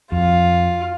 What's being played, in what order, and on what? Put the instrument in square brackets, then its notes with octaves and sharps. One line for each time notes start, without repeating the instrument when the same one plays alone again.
[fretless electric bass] F2 [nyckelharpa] F4